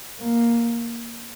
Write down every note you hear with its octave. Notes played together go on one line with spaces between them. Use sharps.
A#3